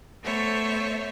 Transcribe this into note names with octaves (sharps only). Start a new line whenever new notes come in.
A3 B3 A4 C5 C#5 E5